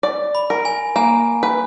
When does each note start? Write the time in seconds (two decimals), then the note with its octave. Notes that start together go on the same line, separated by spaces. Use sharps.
0.03 D5
0.35 B5
0.50 A#4
0.65 G#5
0.96 A#3 G#5
1.43 B4